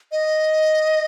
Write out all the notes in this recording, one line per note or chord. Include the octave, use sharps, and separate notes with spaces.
D#5